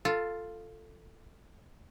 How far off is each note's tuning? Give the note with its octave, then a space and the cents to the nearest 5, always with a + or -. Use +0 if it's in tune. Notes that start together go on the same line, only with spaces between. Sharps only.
F4 +0 A4 +10